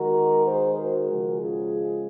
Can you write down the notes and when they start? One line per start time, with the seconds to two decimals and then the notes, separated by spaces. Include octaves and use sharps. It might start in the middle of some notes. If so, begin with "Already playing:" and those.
Already playing: D#3 G#3 F#4 A#4
0.48 G#4 C5
0.77 F#4 A#4
1.09 C#3 F3 G#3
1.39 F4 G#4